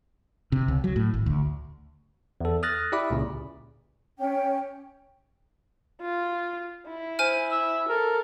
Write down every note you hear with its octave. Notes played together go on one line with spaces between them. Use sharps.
C3
C#2
F#3
A2
G#1
D2
E2 A4
D#6 F6 F#6 A6 A#6
E4 G4 D5 E5 B5 D6
C#2 A#2 C#3
C#4 G5
F4
E4
C5 G#5 F6
E5
A4 A#4